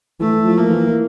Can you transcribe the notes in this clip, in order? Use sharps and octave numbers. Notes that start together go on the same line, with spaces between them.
E3 A3
F3
A#3
E3